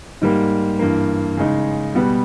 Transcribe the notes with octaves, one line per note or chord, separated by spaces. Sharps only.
G#2 G3 A#3
G2 E3 A#3
C#3 G#3 D#4
B2 G3 B3